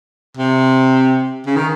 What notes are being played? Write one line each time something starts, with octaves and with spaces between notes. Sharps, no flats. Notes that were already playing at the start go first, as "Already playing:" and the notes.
C3
C#3
D#3